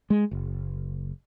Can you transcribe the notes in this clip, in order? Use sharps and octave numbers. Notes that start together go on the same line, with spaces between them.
G#3
F#1